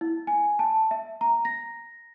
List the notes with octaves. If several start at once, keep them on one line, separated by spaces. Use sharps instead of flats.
E4
G#5
A5
E5
A#5
A#6